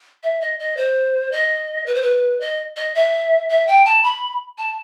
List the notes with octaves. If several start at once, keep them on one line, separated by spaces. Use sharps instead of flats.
E5
D#5
D#5
C5
D#5
B4
C5
B4
D#5
D#5
E5
E5
G5
A5
B5
A5